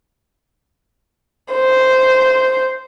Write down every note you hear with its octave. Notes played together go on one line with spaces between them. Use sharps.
C5